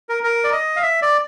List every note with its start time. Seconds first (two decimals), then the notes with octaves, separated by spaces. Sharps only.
0.09 A#4
0.23 A#4
0.44 D5
0.52 D#5
0.76 F5
0.82 E5
1.02 D5